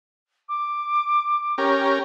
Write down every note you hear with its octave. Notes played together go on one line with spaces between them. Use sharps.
D6
C#4 G4 A#4